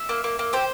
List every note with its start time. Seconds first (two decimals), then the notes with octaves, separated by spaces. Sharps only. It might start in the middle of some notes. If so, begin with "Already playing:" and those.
Already playing: E5
0.09 A#3
0.24 A#3
0.39 A#3
0.53 G4 C5